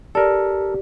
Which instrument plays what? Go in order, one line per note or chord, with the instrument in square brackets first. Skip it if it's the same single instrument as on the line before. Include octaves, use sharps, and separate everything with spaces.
[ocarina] G4 [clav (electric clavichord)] A4 A#4 [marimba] D5